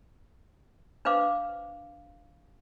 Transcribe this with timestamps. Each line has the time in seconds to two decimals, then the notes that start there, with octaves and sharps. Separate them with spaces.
1.05 D4 B4 C5 F5 D6